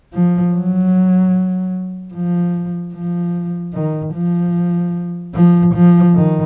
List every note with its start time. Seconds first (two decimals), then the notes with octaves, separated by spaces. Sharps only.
0.13 F3
0.54 F#3
2.14 F3
2.94 F3
3.74 D#3
4.14 F3
5.35 F3
5.74 F3
6.15 D#3